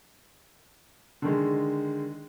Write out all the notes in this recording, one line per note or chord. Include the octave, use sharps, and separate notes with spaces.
D3 D#3 G#3